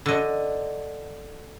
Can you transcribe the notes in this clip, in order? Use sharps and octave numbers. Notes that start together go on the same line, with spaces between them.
D3 D#5